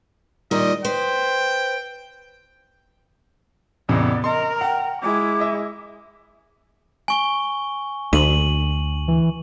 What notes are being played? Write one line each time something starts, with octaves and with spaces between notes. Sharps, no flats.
A#2 D#3 G3 D#5
B4 C5 G5
A1 E2 C3 B3 D5
A#4 D#5 C6
F#5 G5
G#3 E4 D6
D#5 E5
G#5 C#6 G7
D2 D#7 F#7
E3